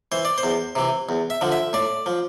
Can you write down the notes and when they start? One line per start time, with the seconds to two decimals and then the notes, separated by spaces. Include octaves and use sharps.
0.12 E3 C5
0.25 D5
0.38 C5
0.43 E2
0.75 C3 E3
1.09 E2
1.30 E5
1.41 D3 F3
1.52 E5
1.73 A2 D5
2.06 F3